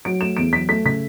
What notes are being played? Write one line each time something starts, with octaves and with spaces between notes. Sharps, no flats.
F#3 D7
A3 E7
E2 D7
F#3 B6
A3 B6
C#3 B6